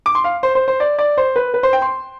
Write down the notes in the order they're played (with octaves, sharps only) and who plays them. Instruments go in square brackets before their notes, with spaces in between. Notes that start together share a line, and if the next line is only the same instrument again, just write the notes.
[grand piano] D6
C6
F5
C5
C5
C5
D5
D5
C5
B4
B4
C5
G5
C6